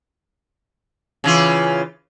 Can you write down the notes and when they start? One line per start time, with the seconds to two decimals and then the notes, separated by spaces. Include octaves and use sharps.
1.24 C#3 E3 F4